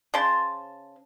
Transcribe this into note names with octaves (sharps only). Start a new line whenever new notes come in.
C#3 C5 A5 C6